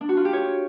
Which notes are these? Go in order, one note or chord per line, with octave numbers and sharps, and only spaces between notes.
D4
F#4
F4
G4
C#5